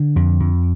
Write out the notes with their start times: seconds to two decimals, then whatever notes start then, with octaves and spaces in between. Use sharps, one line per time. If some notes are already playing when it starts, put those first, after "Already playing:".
Already playing: D3
0.16 F2
0.40 F2